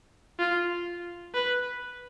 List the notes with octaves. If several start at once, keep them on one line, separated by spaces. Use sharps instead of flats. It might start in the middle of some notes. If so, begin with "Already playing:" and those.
F4
B4